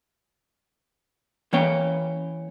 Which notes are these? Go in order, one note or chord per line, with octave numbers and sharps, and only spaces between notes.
E3 A#3 C#4 C#5 G5